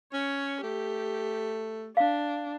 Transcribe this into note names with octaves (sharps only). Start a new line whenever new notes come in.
C#4 C#5
A3 G4
D4 F5